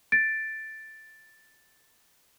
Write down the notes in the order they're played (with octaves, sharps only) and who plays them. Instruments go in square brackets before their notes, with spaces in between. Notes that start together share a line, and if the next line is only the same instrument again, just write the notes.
[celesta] A6 D7